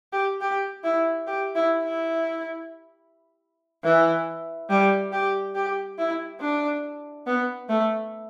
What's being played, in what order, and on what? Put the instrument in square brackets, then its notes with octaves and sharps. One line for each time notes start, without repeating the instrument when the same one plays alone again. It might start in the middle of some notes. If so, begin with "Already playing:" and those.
[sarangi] G4
G4
E4
G4
E4
E4
E3
G3
G4
G4
E4
D4
B3
A3